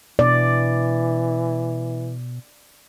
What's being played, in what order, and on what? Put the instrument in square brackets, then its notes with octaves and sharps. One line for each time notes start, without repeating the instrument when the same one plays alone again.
[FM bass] B2 [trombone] E3 [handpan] D5